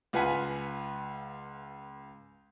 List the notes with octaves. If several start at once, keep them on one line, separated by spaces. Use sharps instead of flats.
C#2 F4 B4 F#5 G#5 B6